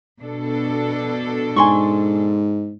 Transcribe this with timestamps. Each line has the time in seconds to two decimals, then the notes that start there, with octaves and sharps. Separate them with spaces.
0.21 B2 D4 A4
1.56 G#2 G#5 C6 C#6